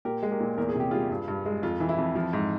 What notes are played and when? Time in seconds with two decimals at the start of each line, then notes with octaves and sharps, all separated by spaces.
0.05 A#2 G4 A#4
0.23 G#3
0.31 G4 A#4
0.40 A#2
0.58 E2 A#4
0.69 G#4
0.75 C3 G4
0.91 G3 F4 G#4
1.10 G2
1.28 G2
1.45 G#3
1.63 F2 F4
1.80 E3
1.89 E4
1.98 F2
2.16 F3
2.33 G#2